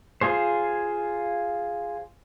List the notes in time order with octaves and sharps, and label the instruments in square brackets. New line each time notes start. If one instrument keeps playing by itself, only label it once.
[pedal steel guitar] F4 G#4 C5